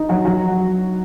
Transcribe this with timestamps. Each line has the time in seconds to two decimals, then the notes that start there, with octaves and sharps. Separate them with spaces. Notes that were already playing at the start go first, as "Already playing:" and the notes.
Already playing: D#4
0.09 F#3 F#4
0.25 F#3 F#4